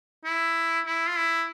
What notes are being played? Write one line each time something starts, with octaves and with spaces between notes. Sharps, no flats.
E4
E4
F4
E4